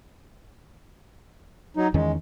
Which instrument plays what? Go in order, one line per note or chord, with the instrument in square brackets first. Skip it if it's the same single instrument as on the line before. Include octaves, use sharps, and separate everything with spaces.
[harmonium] F#3 D#4
[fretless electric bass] E2 D#3 C#4 [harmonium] G#3